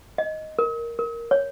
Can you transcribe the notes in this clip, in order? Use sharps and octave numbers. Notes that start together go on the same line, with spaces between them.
D#5
A#4
A#4
C#5